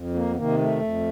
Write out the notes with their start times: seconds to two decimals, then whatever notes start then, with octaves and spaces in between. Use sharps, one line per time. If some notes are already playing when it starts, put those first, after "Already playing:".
Already playing: F2
0.14 A#3
0.31 B3
0.36 C3 D#3 A#3
0.58 A3
0.80 F2